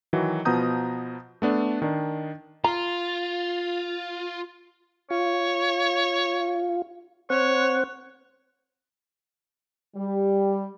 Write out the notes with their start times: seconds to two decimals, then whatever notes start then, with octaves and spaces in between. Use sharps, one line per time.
0.13 D#3 E3 F#3 F#4
0.45 B2 F3 B3 A#5 D#6 G6
1.42 A3 B3 D4 A4
1.82 D#3 D4
2.64 F4 A#5
5.11 F4 C#5
7.30 C4 C5 C#5 F#5
9.95 G3